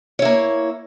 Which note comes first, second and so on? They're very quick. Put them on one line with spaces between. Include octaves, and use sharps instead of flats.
C#5 E4 A#3